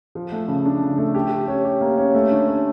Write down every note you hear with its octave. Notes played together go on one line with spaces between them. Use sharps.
F3
A3
C#3
D4
C#3
A3
G4
G4
C#4
G4
A#3
C#4
A3
D3
C#4